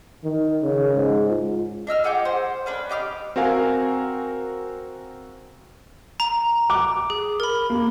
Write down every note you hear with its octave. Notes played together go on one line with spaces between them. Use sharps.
D#3
C#3
G#2
F4
D4 D#5 E6 F6
G#4 F#5 G5 D6
C5
C#4 D4 B4
D#4 G4 D6 F6
C4 F#4 A#4 F5 G#5
A#5
D6
G#4
A#4 B5
A#3